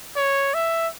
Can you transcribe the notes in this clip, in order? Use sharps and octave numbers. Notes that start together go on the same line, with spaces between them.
C#5
E5